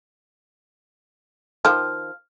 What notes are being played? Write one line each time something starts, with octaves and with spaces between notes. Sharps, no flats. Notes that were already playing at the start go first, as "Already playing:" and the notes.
D#3 F3 F6